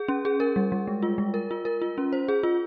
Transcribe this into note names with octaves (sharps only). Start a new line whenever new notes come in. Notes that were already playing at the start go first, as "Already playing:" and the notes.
Already playing: G#4
C#4
G#4
A#4
G3
G3
G#3
F4
G#3
A#4
F4
A#4
F4
C#4
C5
G#4
F4